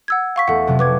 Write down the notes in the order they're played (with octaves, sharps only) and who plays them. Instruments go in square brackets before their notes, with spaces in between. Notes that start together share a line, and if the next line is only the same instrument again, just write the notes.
[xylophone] F#5 E6 G#6
F5 C#6 B6
[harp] E2 A3 [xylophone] A4 F#5
[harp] F2 C3 F#3
[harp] C#2 [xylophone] B4 D6 G#6